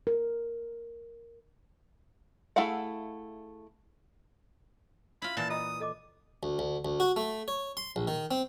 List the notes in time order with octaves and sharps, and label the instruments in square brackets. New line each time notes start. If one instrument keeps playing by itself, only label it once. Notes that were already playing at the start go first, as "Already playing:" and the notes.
[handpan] A#4
[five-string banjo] A3 E4 G#4 F5 F#5
[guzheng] E4 F4 [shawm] B5
[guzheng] A#2 E3 [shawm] A5
[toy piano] F4 D#5 A#5 [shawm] D#6
[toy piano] A4 D#5 D6
[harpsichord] D2
D2
D2
F#4
A3
C#5
C6
A#1
D#3
C4